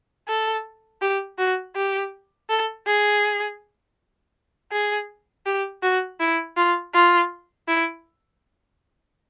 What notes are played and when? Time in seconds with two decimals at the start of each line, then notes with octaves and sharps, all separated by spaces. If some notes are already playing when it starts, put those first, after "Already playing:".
0.28 A4
1.02 G4
1.38 F#4
1.76 G4
2.50 A4
2.87 G#4
4.72 G#4
5.46 G4
5.83 F#4
6.20 E4
6.57 F4
6.94 F4
7.68 E4